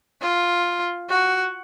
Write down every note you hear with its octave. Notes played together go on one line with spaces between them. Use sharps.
F4
F#4